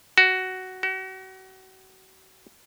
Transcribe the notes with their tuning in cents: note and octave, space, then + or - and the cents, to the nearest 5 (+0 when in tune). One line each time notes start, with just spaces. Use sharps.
F#4 +10
F#4 +35